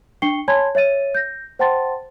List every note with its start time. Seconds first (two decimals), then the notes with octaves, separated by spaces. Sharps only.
0.22 D4 G5 C#6 C7 C#7 G7
0.48 C#5 G#5 A5 B5 C6 G#6
0.75 C#5 E5 A6 D#7
1.15 G6 A#6
1.59 C5 F#5 G5 A5 C6 A6